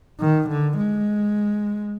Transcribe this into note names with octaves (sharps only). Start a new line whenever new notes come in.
D#3
D3
G#3